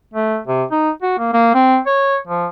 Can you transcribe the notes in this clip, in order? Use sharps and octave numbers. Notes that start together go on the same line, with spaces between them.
A3
C3
D#4
F#4
A#3
A#3
C4
C#5
F3